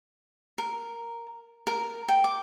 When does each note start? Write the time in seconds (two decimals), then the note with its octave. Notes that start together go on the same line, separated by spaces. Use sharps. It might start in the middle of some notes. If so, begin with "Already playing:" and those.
0.58 A#4
1.67 A#4
2.08 G5
2.24 D6